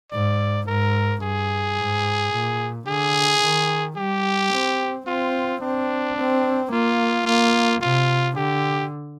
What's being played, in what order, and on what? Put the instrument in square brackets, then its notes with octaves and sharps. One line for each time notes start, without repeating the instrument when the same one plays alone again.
[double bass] G#2 [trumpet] D5
[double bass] G#2 [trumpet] A#4
[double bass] G2 [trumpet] G#4
[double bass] G#2
A#2
[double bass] D3 [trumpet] G#4
[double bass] D#3
[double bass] G3 [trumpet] G4
[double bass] C4
[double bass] C4 [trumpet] F4
[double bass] C4 [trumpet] D4
[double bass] C4
[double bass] A#3 [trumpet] F4
[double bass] A#3 [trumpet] F4
[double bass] C3 [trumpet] F4
[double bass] D3 [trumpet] G4